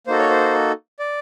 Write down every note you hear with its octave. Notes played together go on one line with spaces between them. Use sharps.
A#3 D#4 F#4 A4 C5
C#5
C5
D5